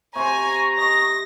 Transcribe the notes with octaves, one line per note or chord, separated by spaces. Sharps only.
C3 C5 G#5 A#5 C#6
D#5 A#6